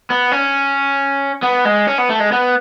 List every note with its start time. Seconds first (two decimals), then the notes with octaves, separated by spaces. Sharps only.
0.10 B3
0.32 C#4
1.43 B3
1.65 G#3
1.87 C#4
1.98 B3
2.09 A3
2.20 G#3
2.32 B3